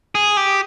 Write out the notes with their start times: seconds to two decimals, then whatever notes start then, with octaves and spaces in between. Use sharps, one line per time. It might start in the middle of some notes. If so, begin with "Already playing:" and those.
0.15 G#4
0.37 G4